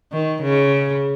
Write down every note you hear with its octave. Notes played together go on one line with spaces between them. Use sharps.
D#3
C#3